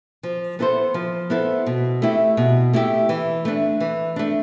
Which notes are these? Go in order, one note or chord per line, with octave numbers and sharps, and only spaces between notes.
F3
B3 E4 A4 C5
F3
B3 E4 A4 C5
B2
A3 E4 G4
B2
A3 E4 G4
E3
A3 D4
E3
A3 D4